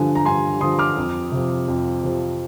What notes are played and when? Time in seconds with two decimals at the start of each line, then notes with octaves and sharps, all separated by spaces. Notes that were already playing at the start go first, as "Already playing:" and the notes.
Already playing: G2 D3 F3 G#5
0.15 A#5
0.25 G2 G#5 C6
0.61 D3 F3 C6 D#6
0.79 D6 F6
0.97 F2
1.32 C3 F3
1.68 F2
2.03 C3 F3